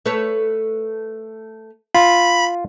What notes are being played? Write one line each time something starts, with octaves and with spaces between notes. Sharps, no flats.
A3 B4 C#5
F4 B5